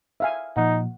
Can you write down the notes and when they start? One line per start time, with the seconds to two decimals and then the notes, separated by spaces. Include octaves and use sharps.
0.20 E5 F5 G#5
0.57 A#2 F3 D#4 F#5